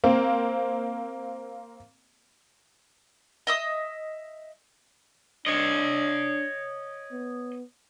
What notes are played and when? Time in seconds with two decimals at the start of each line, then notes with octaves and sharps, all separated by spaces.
0.04 A#3 C4
3.47 D#5 E5 D#6
5.46 D4 C#5 D#5
7.12 B3